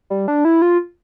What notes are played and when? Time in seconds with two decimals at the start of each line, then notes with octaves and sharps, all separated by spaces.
0.10 G3
0.28 D4
0.45 E4
0.62 F4